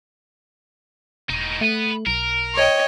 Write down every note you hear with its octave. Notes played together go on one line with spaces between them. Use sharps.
E1 A2 D#4
A3 B3 B4
B1 A#4
C#5 D#5 G5